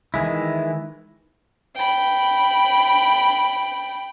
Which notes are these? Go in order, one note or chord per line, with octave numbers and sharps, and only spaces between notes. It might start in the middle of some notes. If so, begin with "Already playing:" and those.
D#3 E3 G#3 E4
G5 B5